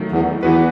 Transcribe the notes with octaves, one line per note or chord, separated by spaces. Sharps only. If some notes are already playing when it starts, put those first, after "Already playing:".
Already playing: D#3 F#3 A3
E2
E2 E3 B3 F#4 B4